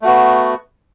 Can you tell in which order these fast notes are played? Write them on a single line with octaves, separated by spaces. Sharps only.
A3 F#4 B3